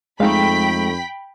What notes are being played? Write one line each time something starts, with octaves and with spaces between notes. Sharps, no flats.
F2 G#3 A3 D#4 F5 G5 B5 B6